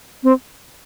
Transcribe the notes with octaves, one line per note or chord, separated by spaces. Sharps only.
C4